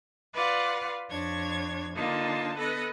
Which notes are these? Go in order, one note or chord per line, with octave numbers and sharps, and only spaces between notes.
F4 B4 D5 F5 F#5
F2 D4 C#5 G#6
D3 A#3 D4 D#4 F4 A5
B3 A4 B4 D#5